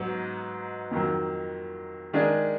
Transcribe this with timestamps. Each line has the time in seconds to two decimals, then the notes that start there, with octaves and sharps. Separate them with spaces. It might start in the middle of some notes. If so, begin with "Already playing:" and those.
Already playing: G#2 F#3 B3 D#4
0.91 F2 D#3 F#3
2.13 D#3 G#3 D4 G#4